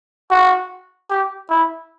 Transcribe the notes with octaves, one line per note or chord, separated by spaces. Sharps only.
F#4
G4
E4